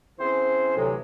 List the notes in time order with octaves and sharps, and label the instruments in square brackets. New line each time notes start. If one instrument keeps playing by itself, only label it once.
[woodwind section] E3 C4 C#4 G#4 C5
D2 A2 C3 E3 F#3 G#3